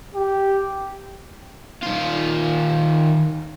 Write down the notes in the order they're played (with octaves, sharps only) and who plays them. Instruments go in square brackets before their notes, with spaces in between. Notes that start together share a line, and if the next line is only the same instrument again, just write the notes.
[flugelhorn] G4
[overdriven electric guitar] D#3 F4